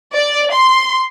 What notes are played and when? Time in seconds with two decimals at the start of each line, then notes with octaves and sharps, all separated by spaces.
0.15 D5
0.52 C6